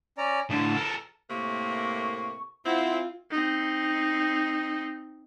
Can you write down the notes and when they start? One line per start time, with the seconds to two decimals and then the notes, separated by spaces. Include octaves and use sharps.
0.18 C#4 D5 A#5
0.51 A2 D3 A5
0.75 A4 A#4
1.30 A2 C3 A#3 C#6
2.66 C4 E4 F4 F#5
3.31 C4 D#4